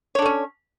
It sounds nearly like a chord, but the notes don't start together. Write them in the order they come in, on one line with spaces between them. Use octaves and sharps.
C#5 D4 A4 C#4